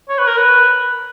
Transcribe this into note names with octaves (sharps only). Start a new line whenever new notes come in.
C#5
B4
A#4
B4